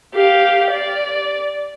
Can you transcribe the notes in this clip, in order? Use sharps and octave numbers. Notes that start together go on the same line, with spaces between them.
G4 F5
D5